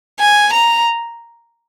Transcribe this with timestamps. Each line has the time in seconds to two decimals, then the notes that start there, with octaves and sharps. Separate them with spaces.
0.20 G#5
0.53 A#5